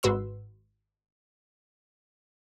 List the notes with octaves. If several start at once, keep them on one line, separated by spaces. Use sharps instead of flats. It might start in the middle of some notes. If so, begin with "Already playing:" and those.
G#1 G#2 F#4 B4 C6 E6